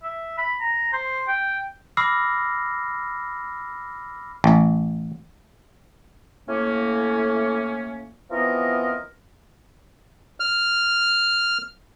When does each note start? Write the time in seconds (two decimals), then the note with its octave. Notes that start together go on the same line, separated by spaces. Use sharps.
0.03 E5
0.38 B5
0.61 A#5
0.93 C5
1.28 G5
1.97 B5 D6 E6 F6 A#6 C7
4.44 A1
6.47 A2 A#3 C#4
8.31 E3 F3 B3 C4 A#4 D#5
10.40 F6